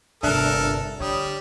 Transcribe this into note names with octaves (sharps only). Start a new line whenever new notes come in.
G1 C3 D4 A4 A#4 E5 F#6
D3 G3 C#5 D#6